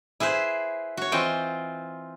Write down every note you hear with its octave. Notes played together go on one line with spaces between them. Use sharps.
E4 G#4 B4 C5
F#4 C#5
E3 C4 F4 D#5 G5